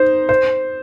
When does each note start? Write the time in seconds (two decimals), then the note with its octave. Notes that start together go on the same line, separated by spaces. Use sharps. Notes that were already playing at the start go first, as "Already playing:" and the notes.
Already playing: D#4 C5
0.29 C5